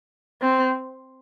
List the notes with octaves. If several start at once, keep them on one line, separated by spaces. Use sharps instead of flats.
C4